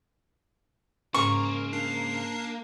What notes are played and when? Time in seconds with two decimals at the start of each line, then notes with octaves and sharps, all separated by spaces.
1.14 G#2 C#3 A#3 C5 C#6
1.73 D4 C7